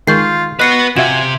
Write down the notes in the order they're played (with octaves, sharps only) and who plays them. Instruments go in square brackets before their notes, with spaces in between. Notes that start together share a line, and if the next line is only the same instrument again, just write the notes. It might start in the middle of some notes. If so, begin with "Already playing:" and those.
[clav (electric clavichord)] D#3 G#3 [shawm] F4 [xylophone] C#6 G6 C7
[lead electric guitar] B3 B4 [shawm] F#4 [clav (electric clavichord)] D#5 [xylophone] F#6 C7 C#7
[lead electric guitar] C3 [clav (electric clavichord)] F4 F#4 E5 [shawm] G#5 [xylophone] E7